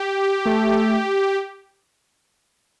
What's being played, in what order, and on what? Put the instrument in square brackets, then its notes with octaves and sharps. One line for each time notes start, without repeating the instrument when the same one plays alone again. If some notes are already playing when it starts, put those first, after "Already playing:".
Already playing: [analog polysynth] G4
[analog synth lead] A3